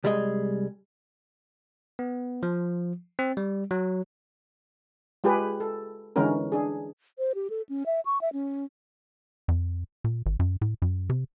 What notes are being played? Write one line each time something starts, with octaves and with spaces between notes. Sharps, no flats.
C2 G3 G#3 G#4 D#5
B3
F3
C4
G3
F#3
G#3 F4 G4 G#4 B4
A4
D3 E3 G#3 C#4 D#4 A#4
D4 G#4
C5
G4
A4
C#4
E5
C#6
E5
C#4
F2
A#2
G#1
F#2
A2
F#2
C3